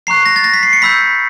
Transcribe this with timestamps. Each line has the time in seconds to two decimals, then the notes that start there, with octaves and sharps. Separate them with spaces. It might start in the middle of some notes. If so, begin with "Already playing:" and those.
0.07 A#5 C#6 F#6 C7
0.26 A#6
0.36 A6
0.44 A#6
0.54 B6
0.63 C7
0.73 C#7
0.82 B5 E6 G6 B6